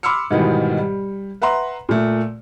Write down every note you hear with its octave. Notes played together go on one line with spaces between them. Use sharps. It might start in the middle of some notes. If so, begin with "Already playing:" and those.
B5 C6 D6 E6 F6 C#7
G#2 B2 D#3 E3 G3
G3
B4 E5 F#5 A#5 C6
A#2 A3